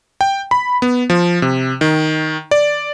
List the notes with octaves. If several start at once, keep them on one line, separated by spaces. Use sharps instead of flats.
G5
B5
B3
F3
C3
D#3
D5